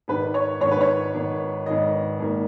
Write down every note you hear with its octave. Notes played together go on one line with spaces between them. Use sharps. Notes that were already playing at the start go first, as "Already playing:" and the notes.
G#1 G#2 D#3 B4
C#5
G#1 G#2 D#3 C#5
B4
C#5
G#1 G#2 D#3
G#1 G#2 D#3 D#5
G#1 G#2 D#3 A#3